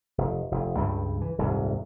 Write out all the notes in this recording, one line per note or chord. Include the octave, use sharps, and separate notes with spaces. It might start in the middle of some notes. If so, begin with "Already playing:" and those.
F1
F1
C#2 G2 G3
E3
D#1 C2 G#2